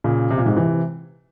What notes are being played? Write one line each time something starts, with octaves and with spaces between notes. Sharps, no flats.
A#2 C#3
C3
A#2
G#2 C3
C3 E3